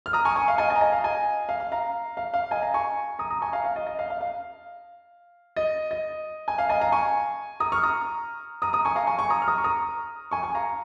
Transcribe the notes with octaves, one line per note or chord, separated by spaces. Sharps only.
F6
A#5 D#6
G#5 C#6
G#5 C#6
F5
D#5 G#5
D#5 G#5
A#5
D#5 G#5
F5
D#5 G#5
F5
F5
F5 A#5
F5
F5
D#5 G#5
F5 A#5
G#5 C#6
A#5 D#6
A#5 D#6
G#5 C#6
F5 A#5
F5
D#5
D#5
F5
F5
F5
D#5
D#5
G#5
F5
D#5 G#5
F5 A#5
G#5 C#6
A#5 D#6
C#6 F6
A#5 D#6
A#5 D#6
A#5 D#6
G#5 C#6
F5 A#5
G#5 C#6
G#5 C#6
A#5 D#6
F6
A#5 D#6
C#6
A#5 D#6
G#5 C#6
G#5 C#6
F5 A#5